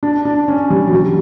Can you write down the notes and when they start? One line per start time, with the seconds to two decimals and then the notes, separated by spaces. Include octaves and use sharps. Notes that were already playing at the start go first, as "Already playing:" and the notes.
0.03 D4
0.25 D4
0.48 C#4
0.70 G3
0.87 F#3
0.93 G3